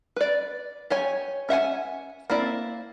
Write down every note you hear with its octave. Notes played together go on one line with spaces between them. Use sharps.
B4 D5
G4 C#5 G#5
C#4 E5 F#5 G#5
A#3 C4 E4 D5